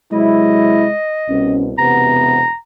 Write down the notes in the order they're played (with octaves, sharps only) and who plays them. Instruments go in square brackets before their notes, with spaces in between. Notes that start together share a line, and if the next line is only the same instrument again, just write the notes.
[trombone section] C3 F#3 E4 [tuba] G#3 [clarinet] D#5
[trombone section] C2 B2 [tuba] C#4
[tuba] E1 [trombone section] C3 B3 [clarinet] A#5